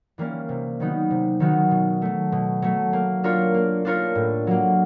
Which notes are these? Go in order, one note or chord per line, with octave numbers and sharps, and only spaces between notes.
E3 G3 A#3 C#4
C3
D#3 F#3 B3 D#4
C3
D#3 F#3 B3 D#4
B2
F#3 A3
B2
F#3 A3
A#3
D4 F4 A#4 C#5
A#3
D4 F4 A#4 C#5
A2
F#3 A#3